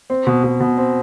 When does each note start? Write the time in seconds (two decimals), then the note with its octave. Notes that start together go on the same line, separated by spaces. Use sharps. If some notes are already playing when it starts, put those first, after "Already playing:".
0.10 C4
0.27 B2
0.44 B2
0.60 B2
0.78 C4